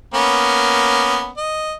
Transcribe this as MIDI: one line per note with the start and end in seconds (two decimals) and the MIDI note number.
0.14 1.29 58
0.14 1.29 59
0.14 1.29 61
1.37 1.74 75